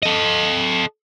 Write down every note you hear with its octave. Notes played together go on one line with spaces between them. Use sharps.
A4 D#5